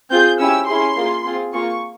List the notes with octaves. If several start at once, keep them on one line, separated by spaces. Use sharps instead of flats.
C4 F4 G#4 G6
C#4 E4 G4 E6
C#4 E4 G#4 C6
A#3 F4 G#4
C4 F4 G#4
A#3 F4 G#4 C#6